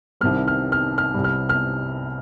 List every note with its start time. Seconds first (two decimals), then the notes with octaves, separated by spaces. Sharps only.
0.21 C2 C3 D#3 G3 F6
0.48 F6
0.72 F6
0.98 F6
1.14 C2 C3 G3
1.24 F6
1.49 F6